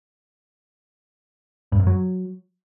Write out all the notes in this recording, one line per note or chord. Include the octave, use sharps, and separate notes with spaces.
G2
F#2
F#3